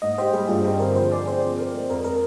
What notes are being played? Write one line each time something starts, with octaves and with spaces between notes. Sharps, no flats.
G#2 D#5
G4 C5
G3 G#4
G2 F4
C4 G4
D3 A#4
F3 C5
G#4 D5
C4 C5
F3
A#4
G#3
F2 A#4
A#4